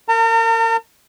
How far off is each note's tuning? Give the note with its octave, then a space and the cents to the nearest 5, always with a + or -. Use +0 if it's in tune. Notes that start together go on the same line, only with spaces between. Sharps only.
A#4 -30 A#5 -45